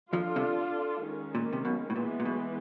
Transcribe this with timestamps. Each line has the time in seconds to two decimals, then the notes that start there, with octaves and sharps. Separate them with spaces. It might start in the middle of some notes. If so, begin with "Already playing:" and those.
0.13 F2 F3 D4 F4 A4
0.36 C2 C3
1.04 D#3 G#3 C#4
1.35 A#2
1.53 C3
1.65 B1 B2
1.90 A2
1.96 A#2 E3 G#3 B3
2.20 A#2
2.25 B1 B2